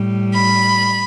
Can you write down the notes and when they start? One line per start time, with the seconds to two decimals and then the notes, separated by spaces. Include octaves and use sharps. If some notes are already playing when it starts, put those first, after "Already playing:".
Already playing: A2 G3
0.32 B5